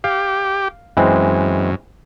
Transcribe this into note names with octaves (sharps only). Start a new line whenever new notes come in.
G4 F5
F#2 E3 G#3 C4